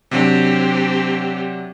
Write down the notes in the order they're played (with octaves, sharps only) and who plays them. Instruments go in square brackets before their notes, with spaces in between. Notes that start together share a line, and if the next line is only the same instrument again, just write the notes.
[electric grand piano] C3 F#3 D4 [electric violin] C4 G4